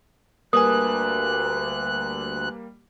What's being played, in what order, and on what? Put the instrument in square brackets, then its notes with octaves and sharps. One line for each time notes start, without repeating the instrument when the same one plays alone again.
[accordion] D2 F#6 [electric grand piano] G3 A#3 [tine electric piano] A#4 B4 G#5 [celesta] D#6